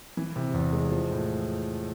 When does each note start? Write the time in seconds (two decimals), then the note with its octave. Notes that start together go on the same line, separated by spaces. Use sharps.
0.17 E3
0.36 C3
0.54 E2
0.73 G#3
0.91 F3
1.10 A2